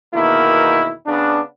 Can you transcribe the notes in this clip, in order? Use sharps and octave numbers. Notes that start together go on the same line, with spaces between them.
E2 B2 D#3 A#3 E4
C#3 B3 D4